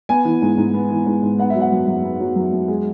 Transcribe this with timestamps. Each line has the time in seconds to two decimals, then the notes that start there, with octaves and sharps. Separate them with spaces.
0.09 B3 G#5
0.25 E3
0.42 G#2
0.57 G#2
0.74 B3
0.90 E3
1.06 G#2
1.23 G#2
1.38 B3 F#5
1.50 F#3 E5
1.61 F#5
1.72 F#2
1.88 F#2
2.04 B3
2.20 F#3
2.36 F#2
2.53 F#2
2.68 G#3